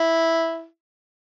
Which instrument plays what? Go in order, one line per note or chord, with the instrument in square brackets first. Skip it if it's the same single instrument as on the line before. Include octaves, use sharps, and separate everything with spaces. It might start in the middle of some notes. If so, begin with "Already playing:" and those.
Already playing: [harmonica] E4